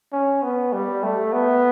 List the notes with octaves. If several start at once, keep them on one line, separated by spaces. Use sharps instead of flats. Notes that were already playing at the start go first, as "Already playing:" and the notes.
C#4
B3
G3
A3
B3